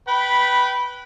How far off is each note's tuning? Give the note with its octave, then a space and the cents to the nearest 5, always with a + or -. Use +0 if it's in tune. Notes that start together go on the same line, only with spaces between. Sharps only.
B4 +0 G5 -25 B5 -10